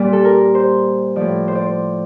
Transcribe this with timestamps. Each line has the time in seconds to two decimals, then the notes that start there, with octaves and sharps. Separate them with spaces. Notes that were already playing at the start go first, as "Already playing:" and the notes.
Already playing: A#2 G3 D5
0.13 A4
0.25 A#4
0.55 C5
1.16 A2 F3 D5
1.48 C5
1.55 D5
1.62 C5